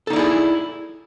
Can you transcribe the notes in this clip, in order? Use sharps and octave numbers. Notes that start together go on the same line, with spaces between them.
D#4 E4 G#4 A4 D5